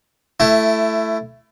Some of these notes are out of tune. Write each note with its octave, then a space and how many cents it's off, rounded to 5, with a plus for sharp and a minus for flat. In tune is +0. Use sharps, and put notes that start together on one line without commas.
A3 +0 E4 +20